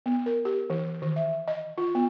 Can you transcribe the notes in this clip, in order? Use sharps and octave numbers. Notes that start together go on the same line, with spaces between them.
B3
A#4
G4
E3
D#3
E5
D#5
F4
B3